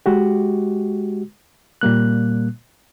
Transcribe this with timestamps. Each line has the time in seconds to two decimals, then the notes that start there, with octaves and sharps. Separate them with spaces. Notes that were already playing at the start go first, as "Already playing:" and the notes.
0.06 G#3 F#4 G4
1.81 A#2 G3 A#3 F#6